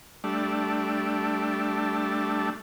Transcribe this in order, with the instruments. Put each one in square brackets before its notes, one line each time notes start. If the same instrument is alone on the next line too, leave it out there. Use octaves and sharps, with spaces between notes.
[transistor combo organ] G3 A3 D4